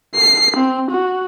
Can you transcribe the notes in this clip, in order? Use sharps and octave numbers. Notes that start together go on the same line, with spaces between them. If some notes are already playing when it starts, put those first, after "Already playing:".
C7
C4
F#4